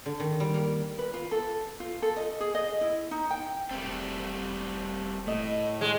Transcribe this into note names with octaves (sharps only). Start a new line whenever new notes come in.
D3
D#3
G3
A#3
B4
F4
A4
F4
A4
D#5
G#4
D#5
E4
D#4
G5
E1 G3 A3 C4
A2 A3 D#5
G#3